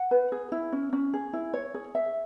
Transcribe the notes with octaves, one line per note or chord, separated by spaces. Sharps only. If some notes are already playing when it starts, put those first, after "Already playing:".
Already playing: F#5
B4
G#4
E4
C#4
C#4
G#4
E4
C#5
G#4
E5